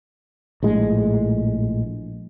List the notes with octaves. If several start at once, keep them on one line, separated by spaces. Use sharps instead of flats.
A#1 A2 G#3